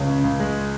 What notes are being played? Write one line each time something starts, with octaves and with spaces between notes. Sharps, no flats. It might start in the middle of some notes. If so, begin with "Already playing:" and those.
Already playing: C#2 G#3 C#5
C#3
C#2
G#3